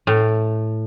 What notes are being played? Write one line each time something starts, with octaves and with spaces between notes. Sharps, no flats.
A2